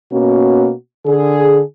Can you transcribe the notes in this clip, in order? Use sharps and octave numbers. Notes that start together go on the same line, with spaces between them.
B2 A#3 C#4 F#4
D3 G#4